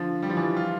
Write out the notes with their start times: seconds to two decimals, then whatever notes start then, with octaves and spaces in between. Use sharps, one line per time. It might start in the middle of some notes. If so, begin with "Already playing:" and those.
Already playing: D3 F3
0.23 G3
0.30 F3
0.37 E3 G3
0.57 F4